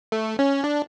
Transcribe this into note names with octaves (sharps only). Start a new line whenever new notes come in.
A3
C#4
D4